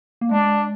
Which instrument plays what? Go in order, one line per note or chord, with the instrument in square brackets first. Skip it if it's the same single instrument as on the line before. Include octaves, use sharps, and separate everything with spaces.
[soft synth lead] A#3
[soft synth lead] G#3 [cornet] D4